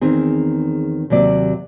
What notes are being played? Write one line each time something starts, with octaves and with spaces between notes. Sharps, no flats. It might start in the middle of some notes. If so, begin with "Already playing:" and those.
E2 D#3 C4 G#4
D#2 C3 F#3 D5